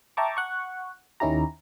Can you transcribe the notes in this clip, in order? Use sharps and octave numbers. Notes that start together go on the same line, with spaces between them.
E5 G5 A5 A#5 C#6 D6
F#5 C#6
D#2 D#3 C#4 E4 G4 A#5